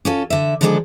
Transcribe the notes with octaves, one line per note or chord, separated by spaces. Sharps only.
C#4 F4 A4
D3 E5
D3 D#3 F3 G#3 D4 A4